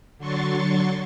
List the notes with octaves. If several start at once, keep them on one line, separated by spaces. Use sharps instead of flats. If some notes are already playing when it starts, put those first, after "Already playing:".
D3 F#3 C6 C#6 A6